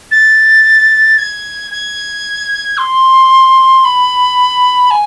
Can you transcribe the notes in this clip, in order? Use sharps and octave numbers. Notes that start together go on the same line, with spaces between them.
A6
G#6
G#6
C6
B5
G#5